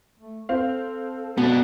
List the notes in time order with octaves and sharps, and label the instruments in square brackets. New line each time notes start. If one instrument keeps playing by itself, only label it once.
[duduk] A3
[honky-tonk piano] C4 F5 [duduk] A4
[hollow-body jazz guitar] B2 [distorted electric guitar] B3 D4